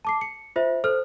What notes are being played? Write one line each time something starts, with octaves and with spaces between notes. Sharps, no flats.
A5 D6 C7
C#7
F4 C5 E5
A4 C5 F6